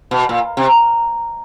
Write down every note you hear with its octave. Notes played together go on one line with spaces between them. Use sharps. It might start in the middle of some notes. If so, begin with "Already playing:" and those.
B2
A#2
C3